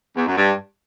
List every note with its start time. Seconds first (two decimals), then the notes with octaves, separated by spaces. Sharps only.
0.17 E2
0.26 F#2
0.36 G2